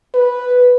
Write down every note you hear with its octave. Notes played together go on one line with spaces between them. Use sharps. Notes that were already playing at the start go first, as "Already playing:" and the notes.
B4